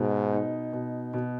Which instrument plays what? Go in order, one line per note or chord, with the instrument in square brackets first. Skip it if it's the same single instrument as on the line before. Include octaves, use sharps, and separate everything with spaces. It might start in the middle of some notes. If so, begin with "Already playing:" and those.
Already playing: [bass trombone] G#2 [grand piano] B2
[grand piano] D#4
B2
B2